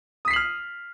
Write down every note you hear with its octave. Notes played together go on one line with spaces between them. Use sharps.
D#6 F6 B6 C7 F#7